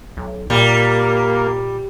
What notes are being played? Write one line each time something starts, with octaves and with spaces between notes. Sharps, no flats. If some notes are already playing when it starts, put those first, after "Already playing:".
B1
A#2 G3 A#3